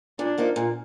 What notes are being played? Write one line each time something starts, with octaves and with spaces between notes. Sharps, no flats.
A#2 D4
F3 A#3 D#4
A#2